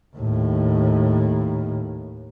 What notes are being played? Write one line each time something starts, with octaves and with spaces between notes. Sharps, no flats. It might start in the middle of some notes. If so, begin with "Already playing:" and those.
D#2 A2